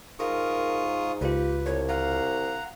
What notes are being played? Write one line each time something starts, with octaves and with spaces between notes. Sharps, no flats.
G#2 F4 A#4 C#6 D#6
C#2 F4 G4 B4
C2 C#5
F5 F#5 A#5